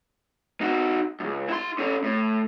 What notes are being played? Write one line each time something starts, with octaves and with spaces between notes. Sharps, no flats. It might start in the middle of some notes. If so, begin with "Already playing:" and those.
D#4 F#4
C#2 F#2
E4 C6
C#4 A4
A2